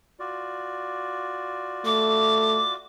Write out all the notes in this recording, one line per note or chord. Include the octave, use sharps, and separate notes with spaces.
F4 F#4 D5
A3 D6